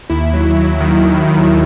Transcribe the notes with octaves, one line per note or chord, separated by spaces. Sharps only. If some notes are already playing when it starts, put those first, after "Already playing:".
D#2 E4
F#3
F#3
D#3
D#2
D#3